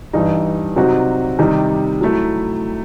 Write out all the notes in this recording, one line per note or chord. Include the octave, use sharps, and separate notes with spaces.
G2 E3 G3 D#4
C3 F#3 C4 D#4 F#4
C3 D#3 G3 D#4 G4
F#3 A3 E4